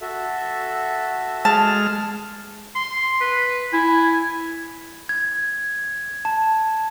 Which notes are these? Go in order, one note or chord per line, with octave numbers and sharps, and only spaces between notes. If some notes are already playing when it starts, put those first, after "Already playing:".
F#4 A4 E5
G#3 A5 F6
C6
B4
E4 G#5
G#6
A5